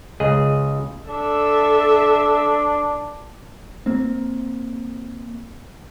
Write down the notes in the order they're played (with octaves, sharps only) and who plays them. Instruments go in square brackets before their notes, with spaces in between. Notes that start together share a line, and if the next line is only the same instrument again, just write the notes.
[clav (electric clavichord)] C#2 G#4 D#5
[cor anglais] D4 [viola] A4 E5
[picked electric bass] A#3 C4